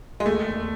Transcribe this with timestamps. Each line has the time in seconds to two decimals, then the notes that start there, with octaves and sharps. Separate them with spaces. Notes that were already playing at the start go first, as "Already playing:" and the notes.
0.20 G#3
0.26 D#2 A3
0.47 E1